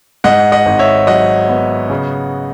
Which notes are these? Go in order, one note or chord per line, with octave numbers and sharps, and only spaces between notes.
G#2 D#5 F#5
D#5 F#5
G#1
C#5 E5
F#3 D#5 F#5
B3
C#3